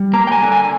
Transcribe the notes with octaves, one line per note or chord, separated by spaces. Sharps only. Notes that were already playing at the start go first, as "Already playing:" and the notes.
Already playing: G3
A#3 A#5
G5
G#5
D3
G#5